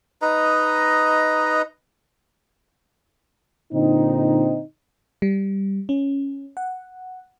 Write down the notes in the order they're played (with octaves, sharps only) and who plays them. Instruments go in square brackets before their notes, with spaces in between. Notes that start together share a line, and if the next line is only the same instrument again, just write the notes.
[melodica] D#4 B4 D#5 A#5
[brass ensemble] A#2 D3 C4 D#4
[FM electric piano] G3
C#4
F#5